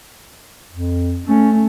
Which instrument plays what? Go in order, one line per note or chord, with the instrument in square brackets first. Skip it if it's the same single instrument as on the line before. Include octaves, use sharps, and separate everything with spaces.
[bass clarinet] F2
[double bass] A3 [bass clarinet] C#4